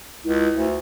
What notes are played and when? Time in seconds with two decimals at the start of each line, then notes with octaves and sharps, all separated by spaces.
0.24 C#2 E4
0.55 D2